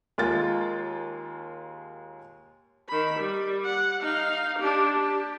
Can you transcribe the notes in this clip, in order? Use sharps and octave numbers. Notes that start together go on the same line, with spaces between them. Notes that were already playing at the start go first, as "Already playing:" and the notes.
D#2 G#3 A#3 F4 A6
D#3 B5
G3
F#5
D#4 F5
D4 G4
G4